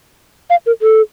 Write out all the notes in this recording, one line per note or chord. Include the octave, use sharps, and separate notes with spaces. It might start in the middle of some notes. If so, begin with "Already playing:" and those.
F5
A#4
A4